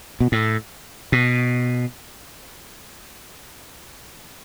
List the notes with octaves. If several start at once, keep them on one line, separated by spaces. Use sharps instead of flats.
B2
A2
B2